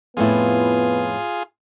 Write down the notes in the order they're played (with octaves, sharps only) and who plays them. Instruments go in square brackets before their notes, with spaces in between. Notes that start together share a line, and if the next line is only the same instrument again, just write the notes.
[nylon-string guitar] F2 A2 E4 [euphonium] B3 [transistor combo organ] F4 G#4